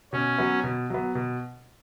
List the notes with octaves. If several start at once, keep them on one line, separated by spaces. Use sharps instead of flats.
B2 C#4
F#3 B3
B2
F#3 B3
B2